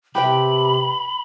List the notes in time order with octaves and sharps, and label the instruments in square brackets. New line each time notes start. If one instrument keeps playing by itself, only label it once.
[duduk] C3 [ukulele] G4 B4 G5 [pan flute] B5